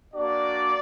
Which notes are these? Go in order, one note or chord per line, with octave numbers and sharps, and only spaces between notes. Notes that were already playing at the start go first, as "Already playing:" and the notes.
A#3 D4 F#4 D5